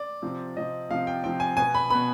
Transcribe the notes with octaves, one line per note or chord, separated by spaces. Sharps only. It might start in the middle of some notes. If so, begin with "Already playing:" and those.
Already playing: D5
C3 F3 C4
C3 F3 C4 D#5
C3 F3 C4 F5
G5
C3 F3 C4 G5
G#5
B2 B3 G#5
B5
B2 B3 B5